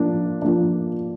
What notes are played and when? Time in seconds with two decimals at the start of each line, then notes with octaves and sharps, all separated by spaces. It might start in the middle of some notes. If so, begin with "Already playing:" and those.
Already playing: F3 A#3 D4
0.42 F3 A#3 D4